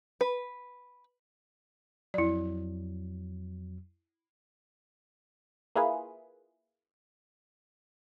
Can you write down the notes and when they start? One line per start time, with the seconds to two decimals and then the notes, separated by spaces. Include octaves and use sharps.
0.21 B4
2.14 F2 F#3 E4 D5
5.76 A#3 E4 F4 G#4 B4